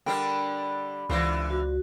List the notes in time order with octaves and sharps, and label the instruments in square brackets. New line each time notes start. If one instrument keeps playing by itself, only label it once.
[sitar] D3 G3 D4 [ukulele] A#4 G5 [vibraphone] B5
[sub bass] C#2 [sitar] D3 E3 [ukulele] F4 C5 D5
[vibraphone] F#4